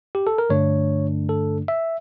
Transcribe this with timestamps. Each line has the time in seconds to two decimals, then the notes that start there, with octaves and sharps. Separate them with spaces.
0.15 G4
0.27 A4
0.38 A#4
0.50 G2 D3 A3 D4 C#5
1.29 A4
1.68 E5